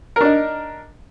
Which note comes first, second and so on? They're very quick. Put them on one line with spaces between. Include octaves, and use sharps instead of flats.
A#4 D4 D#4